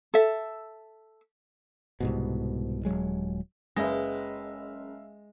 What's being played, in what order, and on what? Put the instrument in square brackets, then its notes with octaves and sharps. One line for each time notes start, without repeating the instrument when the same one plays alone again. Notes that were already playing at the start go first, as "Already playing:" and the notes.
[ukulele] A4 E5
[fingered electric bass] C2 G#2 B2
D#1 F#2 F#3 G#3
[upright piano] F#1 B4 [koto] G#3 [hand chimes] C#4 [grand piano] E5 F5 A#6